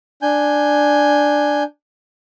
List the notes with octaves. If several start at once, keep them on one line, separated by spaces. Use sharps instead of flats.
D4 G#5 G6